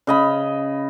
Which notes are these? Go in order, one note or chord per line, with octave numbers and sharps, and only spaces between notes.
C#3 D#5 B5